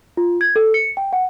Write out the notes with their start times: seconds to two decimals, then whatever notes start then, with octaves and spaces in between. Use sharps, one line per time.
0.17 F4
0.41 G#6
0.56 A4
0.74 C#7
0.97 G5
1.13 F#5